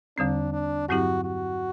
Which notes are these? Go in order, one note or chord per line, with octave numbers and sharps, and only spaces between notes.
E2 D3 G3 C4 D4
D4
G2 F#3 C4 E4 F#4 G4
F#4